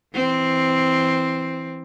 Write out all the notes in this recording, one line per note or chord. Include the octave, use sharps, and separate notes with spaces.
E3 C4